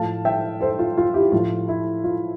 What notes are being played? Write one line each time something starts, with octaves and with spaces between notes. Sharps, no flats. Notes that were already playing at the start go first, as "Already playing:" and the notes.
Already playing: A2 F3 F5 A5
E5 G5
A4 C5
F4
F4
E4 G4
A2 F3 F4
E4
F4